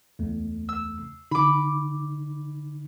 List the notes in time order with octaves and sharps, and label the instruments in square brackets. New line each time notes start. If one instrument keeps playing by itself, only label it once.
[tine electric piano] E2 A3
[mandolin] E6
[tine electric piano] D3 D#4 [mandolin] B5 D6